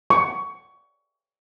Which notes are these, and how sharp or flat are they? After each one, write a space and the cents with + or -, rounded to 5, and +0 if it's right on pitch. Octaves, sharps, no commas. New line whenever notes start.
C#6 +20